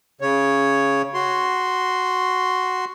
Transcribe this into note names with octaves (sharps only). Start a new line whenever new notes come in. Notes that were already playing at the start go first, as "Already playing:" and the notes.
C#3 C#5
F#4 C6